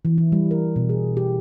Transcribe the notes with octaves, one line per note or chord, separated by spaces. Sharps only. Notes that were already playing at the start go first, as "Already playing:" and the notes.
E3
E4
G3
A#4
B2
G#4
G4